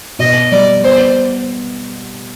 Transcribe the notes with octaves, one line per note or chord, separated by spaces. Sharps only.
B2 D#5
G3 D5
B3 C5